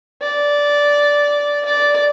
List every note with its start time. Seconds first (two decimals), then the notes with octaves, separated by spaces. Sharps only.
0.22 D5
1.65 D5